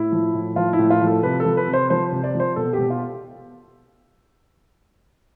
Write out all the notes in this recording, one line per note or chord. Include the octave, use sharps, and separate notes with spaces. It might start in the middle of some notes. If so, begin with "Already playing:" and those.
Already playing: A2 E4
F3
A2
F3 F4
E4
A2
F4
F3
A4
C3 B4
A4
F3
B4
C3
C5
F3 C5
C3
D5
F3
C5
B2 A4
G4
B2
F4